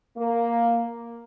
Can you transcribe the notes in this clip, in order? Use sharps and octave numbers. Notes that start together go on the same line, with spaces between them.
A#3